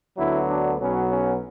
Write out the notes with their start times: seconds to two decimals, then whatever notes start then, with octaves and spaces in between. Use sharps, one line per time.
0.17 D2 D3 F#3 B3 E4
0.48 D4
0.79 B1 B2 F#3 B3 C#4
1.10 C#4